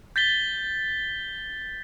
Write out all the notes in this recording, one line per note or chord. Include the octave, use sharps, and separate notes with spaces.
G6 A6 B6 G7